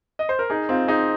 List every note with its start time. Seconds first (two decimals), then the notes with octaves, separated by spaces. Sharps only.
0.19 D#5
0.29 C5
0.39 A#4
0.50 D#4 G#4
0.69 C4 F4
0.88 D#4 G#4